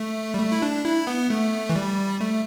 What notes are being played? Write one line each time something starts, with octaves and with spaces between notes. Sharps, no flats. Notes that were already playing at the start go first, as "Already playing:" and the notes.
Already playing: A3
G3
A3
E4
D4
E4
B3
A3
E3
G3
A3